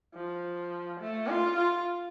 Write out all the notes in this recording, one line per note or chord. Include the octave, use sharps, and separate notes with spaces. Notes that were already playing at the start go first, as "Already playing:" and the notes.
F3
A3
F4
F4